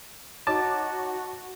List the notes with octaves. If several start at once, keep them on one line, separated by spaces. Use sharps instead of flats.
D#4 F#4 C#5 A5 D6